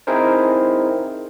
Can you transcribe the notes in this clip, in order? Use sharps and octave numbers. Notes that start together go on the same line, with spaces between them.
C4 D#4 E4 G#4 A#4 C5